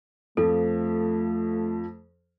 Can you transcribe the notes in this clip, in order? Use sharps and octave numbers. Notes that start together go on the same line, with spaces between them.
F2 F3 A3 A4